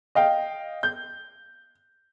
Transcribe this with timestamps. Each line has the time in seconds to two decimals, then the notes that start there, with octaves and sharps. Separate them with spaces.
0.15 D#5 F5 G5
0.83 G6